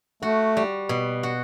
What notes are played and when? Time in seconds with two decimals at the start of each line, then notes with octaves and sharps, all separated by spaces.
0.22 A3 F#4
0.57 G3
0.89 B2
1.23 F#4